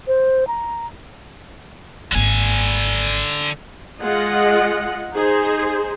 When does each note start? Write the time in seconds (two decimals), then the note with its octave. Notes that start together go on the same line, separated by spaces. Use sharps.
0.08 C5
0.48 A#5
2.12 G#1 D3 A#3 G#5
4.02 G#3 F4 D#5 F#5
5.12 D#4 G#4 C5